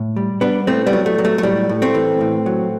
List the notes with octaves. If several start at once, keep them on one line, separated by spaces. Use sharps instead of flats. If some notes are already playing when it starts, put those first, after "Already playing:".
Already playing: A2
G3
G3 B3 D4
A2 A3 C4
G3 B3
F#3
A3
F#3
A3
A3
A2 G3
A2
A3 C4
E3
A2
F#3